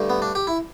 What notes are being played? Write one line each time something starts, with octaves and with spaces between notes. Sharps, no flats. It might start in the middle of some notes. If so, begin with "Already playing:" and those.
Already playing: G2 D3 A3
B3
D4
G4
E4